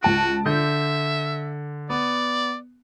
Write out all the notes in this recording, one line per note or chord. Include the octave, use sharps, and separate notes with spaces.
C#2 F#4 A5 D7
D3 E5 G6
B3 D5